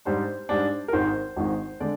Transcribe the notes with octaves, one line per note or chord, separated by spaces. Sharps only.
G#2 G3 D4 C5
G#2 G3 D4
A#4
G#1 G#2 D#3 C5
G#1 G#2 D#3
D3 G#3 D5